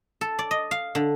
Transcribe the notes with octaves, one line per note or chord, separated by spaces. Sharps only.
A4
D5
D#5
F5
D3